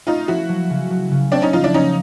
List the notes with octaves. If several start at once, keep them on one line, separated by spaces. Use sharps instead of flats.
A3 D#4 F4
F3 E4 F#4
F#3
C#3
F#3
C#3
A3 C4 D4
C#4 D#4
F3 D#4 F4
D4 E4
A#3 C#4 D#4